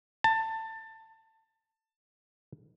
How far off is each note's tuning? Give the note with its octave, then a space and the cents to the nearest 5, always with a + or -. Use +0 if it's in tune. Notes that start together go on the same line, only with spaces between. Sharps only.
A5 +20